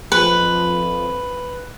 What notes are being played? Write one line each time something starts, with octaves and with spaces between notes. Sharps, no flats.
F2 F3 B4